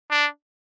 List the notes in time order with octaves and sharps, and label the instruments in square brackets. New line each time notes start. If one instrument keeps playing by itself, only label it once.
[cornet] D4